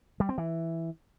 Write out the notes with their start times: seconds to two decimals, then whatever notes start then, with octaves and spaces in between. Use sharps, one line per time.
0.20 G3
0.29 C4
0.38 E3